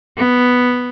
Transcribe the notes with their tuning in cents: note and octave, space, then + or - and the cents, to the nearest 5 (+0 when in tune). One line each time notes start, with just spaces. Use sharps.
B3 +0